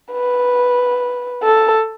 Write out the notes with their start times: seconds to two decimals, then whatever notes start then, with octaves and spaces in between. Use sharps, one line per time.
0.13 B4
1.43 A4